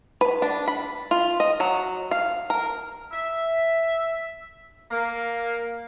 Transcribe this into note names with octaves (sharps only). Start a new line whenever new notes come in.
B4
D4
B5
F4
D#5
F#3
F5
A#4
E5
A#3